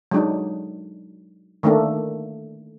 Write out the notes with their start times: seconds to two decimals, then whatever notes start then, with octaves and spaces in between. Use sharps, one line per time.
0.11 F#3 G#3 D4 D#4
1.63 D#3 A3 A#3 D4